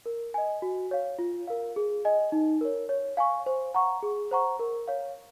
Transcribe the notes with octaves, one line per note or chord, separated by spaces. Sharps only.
A#4
D#5 G#5
F#4
C#5 F5
F4
A#4 F5
G#4
D#5 G#5
D#4
A#4 C#5
C#5
F5 G#5 C#6
C5
F#5 A#5 C#6
G#4
C5 F#5 A#5 C#6
A#4
C#5 F5